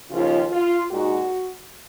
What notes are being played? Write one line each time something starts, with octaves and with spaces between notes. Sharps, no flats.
D#2 C#3 F3 F4
F4
A#2 G#3 D#4 F#4